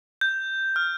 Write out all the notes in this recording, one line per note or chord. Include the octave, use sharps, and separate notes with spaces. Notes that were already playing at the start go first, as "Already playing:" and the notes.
G6
F6